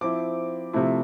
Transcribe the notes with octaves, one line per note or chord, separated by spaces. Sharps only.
F3 C4 E4 D6
C3 F3 A3 E4